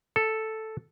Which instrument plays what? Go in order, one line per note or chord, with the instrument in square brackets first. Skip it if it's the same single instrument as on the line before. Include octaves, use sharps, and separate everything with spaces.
[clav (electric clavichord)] A4